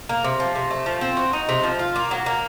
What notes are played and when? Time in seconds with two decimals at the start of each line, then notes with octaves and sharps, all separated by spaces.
0.09 A#3
0.24 C3
0.40 F3
0.56 C3
0.71 A3
0.86 F3
1.01 C4
1.17 F#4
1.33 D#4
1.49 C3
1.64 F3
1.79 F4
1.96 A#3
2.11 F#3
2.26 A#3